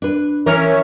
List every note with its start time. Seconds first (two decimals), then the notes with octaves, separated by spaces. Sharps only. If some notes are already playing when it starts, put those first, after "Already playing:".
0.02 D4 B4
0.46 E3 C#4 A#4 C#5 E5 C#6 F6